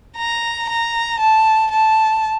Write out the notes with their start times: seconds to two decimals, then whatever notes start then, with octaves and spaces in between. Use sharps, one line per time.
0.17 A#5
0.69 A#5
1.20 A5
1.72 A5